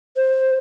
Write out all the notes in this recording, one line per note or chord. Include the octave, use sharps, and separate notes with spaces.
C5